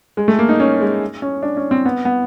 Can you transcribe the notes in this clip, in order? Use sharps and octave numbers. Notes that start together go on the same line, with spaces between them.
G#3
A3
A#3
D#4
C#4
G#3
C#4
D4
C#4
C4
B3
B3